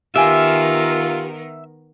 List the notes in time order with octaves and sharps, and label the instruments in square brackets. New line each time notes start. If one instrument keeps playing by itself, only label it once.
[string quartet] D#3 B3 A#4 [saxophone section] F4 [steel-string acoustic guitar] G4 G#5 [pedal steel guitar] E5